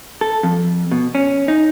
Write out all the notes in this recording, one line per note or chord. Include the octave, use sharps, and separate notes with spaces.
A4
F2
B2
C#4
D#4